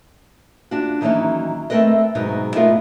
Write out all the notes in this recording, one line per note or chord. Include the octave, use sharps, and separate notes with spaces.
D4 F4 F#4
D#3 E3 F#3 A#3 C#4 D#4
A3 C4 A#4 B4 D#5
G#2 B2 F#3 B3 D#4
A3 B3 F4 A#4 D#5 F5